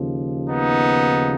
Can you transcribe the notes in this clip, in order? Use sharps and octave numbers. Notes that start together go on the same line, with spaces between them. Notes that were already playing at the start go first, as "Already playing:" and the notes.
Already playing: D#2 C#3 F3
B3 D#4